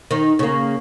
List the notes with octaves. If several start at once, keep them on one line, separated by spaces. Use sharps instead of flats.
D#3
C#3 A#3